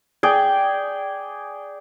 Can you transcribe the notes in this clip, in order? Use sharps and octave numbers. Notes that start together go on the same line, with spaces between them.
G#4 D5 G5